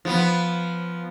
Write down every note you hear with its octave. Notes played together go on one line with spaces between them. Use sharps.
F3 B3